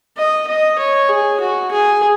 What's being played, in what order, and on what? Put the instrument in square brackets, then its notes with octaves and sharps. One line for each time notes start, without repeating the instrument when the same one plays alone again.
[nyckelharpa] D#5
D#5
C#5
G#4
F#4
G#4